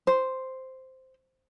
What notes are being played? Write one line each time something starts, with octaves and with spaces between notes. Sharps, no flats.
C5